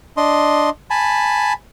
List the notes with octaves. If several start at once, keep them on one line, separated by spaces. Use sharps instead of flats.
D4 D#5 C6
G#5 A5 B5